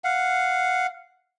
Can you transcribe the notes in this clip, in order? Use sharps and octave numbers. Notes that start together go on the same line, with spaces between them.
F5 F#5